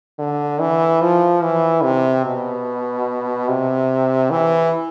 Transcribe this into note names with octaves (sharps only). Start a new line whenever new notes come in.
D3
E3
F3
E3
C3
B2
C3
E3